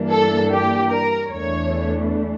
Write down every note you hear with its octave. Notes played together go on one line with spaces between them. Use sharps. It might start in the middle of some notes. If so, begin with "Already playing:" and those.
Already playing: G2 E3 A#3 D4
A4
G4
A#4
E2 E3 A3 D4 C#5